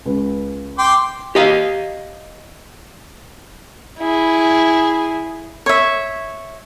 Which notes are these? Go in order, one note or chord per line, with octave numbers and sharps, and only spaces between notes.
C#2
G5 C6 D6
G4 D#5 F5
E4 G#4
C#5 E5